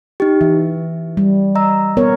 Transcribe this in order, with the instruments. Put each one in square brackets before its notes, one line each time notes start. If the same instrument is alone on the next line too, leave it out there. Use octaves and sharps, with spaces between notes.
[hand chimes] D#4 G4
[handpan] E3 [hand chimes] E5
[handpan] G3
[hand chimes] D#5 A#5 E6
[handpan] B3 A#4 C#5